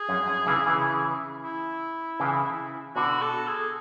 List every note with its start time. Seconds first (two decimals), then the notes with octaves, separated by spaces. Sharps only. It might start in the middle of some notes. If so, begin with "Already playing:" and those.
Already playing: G#4
0.09 F#2
0.27 F#2
0.47 C#3 E3
0.66 C#3 E3
1.44 E4
2.20 C#3 E3
2.96 B2 D3 F#4
3.22 A4
3.47 G#4